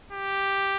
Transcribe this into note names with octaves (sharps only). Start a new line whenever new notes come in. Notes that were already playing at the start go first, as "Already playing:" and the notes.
G4